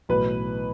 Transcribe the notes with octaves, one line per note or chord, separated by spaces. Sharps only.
B1 A2 E3 B4